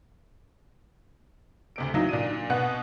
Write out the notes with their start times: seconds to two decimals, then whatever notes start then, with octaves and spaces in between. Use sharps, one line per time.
1.76 D2 C3 D7
1.94 D#3 F#3 A#3 D#4 E4
2.09 A#2 D4 D#7
2.50 B2 B3 F#5 F#6